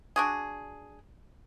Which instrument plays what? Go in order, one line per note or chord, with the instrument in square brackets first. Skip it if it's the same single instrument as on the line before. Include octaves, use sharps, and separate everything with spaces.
[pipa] D4 F#4 G#4